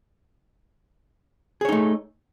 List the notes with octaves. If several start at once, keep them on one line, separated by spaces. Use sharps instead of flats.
A3 D#4 G#4 C#5